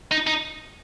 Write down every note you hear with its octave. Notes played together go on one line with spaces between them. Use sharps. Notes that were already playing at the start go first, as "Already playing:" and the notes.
D#4
D#4